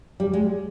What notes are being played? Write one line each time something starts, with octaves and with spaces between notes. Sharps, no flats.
G3
G#3